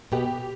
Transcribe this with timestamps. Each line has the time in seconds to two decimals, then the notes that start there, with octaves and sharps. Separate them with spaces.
0.12 B2 G4